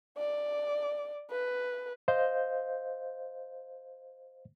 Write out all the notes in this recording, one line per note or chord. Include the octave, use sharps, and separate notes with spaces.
D5
B4
C5 D#5 F5 G6